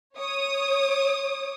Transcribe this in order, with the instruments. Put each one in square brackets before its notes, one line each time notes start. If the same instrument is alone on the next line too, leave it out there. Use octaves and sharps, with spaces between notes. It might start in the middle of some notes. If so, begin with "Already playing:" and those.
[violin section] C#5 D#6